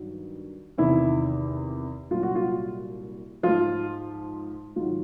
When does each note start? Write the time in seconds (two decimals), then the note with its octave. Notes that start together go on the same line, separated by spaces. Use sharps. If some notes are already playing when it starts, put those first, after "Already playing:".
Already playing: G2 D#3 F#3
0.78 E2 C3 D#3 E4
2.11 C2 A#2 F#3 F4
2.23 F#4
2.35 F4
3.43 G#2 F3 F4
4.76 G#2 D#3 F#3 F4